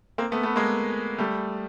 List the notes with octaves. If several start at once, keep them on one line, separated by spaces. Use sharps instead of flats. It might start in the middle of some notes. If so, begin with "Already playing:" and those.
A#3 C4
A3 B3
A3 B3
G#3 A#3
G3 A3